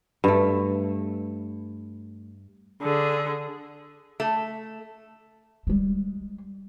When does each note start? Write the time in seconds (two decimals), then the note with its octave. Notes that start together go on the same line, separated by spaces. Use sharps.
0.24 G2 A3
2.82 D3 G#4
4.20 A3
5.67 G3 G#3